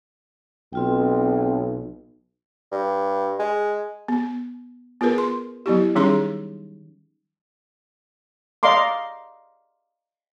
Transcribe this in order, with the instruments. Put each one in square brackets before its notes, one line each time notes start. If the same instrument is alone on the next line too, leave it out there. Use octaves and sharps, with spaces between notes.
[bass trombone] B1 [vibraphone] C4 F4 G5
[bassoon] G2
G#3
[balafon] B3
B3 F4 G#4 A#4 B4
C6
F#3 B3 E4 G4
D#3 G3 C#4 D#4 G#4 C6
[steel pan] D5 D#5 F5 A#5 C6 D6